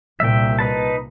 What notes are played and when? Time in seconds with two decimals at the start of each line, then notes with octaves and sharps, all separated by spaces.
0.20 C2 A#2 E5 G5
0.59 D#4 B4 A5